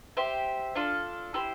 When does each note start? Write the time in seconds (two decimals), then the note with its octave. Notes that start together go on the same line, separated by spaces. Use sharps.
0.17 G4 C5 E5
0.75 D4 F4 A4
1.34 E4 G4 C5